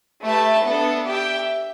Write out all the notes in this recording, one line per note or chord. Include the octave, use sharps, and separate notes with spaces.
A3 G4 B4 E5 A5
B3 D4 A4
G4 E5 G5